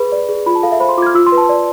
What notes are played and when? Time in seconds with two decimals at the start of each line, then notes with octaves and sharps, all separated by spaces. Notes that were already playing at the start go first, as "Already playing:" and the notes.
Already playing: G#4 B4 B5
0.12 D5
0.29 G#4
0.46 F4 B5
0.55 A5
0.63 A4 F5
0.72 E5
0.80 C5 B5
0.89 C6
0.98 F4 D6
1.02 G#6
1.06 F6
1.14 F4 E6
1.27 C6
1.32 B4
1.37 A5
1.49 D5